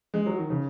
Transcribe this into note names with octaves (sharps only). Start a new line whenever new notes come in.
G#3
F#3
D#3
C#3